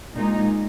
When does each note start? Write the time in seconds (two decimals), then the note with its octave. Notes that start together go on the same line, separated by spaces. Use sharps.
0.14 A#2 G#3 D#4